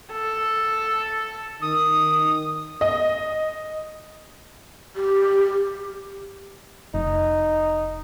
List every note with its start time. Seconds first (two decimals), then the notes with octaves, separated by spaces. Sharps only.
0.12 A4
1.62 D#3 D#6
2.81 D#5
4.96 G4
6.94 F1 D#4